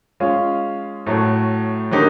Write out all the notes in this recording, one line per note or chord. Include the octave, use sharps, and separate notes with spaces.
G#3 C#4 F4
A2 F#3 A3
D3 F#3 A#3 D#4 G4